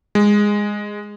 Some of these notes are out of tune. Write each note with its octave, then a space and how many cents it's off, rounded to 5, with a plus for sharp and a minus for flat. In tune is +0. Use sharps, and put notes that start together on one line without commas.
G#3 -10